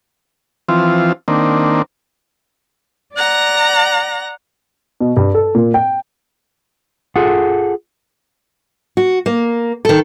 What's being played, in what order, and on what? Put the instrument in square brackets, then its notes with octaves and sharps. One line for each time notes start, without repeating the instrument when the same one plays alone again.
[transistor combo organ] E3 F3 C4 F4
D#3 A#3 C4 D4
[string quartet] D5 F#5 A#5 A#6
[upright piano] B2
G2
A4
A#2
G5
[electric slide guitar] F4 G#4 A4 F#5
[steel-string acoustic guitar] F#4
A#3
D#3 A4